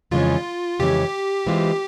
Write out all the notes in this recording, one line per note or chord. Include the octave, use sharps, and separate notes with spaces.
F2 C#3 E3 G#3 C#4 F4
F2 C#3 E3 G#3 C#4 G4
E3 G#3 C4 F4